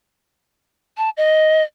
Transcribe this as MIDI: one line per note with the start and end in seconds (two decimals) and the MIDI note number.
0.97 1.10 81
1.17 1.63 75